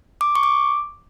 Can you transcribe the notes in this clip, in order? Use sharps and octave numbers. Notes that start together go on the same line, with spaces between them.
D6
C#6
D6